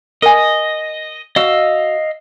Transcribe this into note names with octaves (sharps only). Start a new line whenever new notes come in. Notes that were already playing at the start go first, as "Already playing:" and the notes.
A#4 D#5 G#5
F#4 D#5 F5 E6